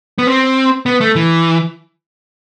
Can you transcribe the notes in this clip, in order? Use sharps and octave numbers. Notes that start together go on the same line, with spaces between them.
B3
C4
B3
A3
E3